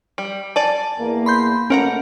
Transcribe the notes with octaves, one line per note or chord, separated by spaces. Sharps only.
G3
D5 G#5 A5
E2 A#3
B5 C6 G6
B2 A3 A#3 C#4 A#4 F#5 A#5